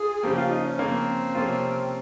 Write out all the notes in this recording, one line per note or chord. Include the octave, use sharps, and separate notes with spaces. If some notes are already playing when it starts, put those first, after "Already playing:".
Already playing: F4 G#4
C#3 F3 A#3 G4
F4
D#4
C#4
C#3 F3 A#3 C4
C3 F3 A#3 C#4 F4